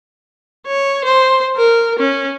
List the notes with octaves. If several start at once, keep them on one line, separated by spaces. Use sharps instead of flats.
C#5
C5
A#4
C#4